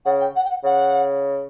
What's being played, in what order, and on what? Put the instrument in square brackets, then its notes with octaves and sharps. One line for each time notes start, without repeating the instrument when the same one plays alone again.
[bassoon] C#3 [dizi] F#5
[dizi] G5
F#5
G5
F#5
[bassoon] C#3 [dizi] F#5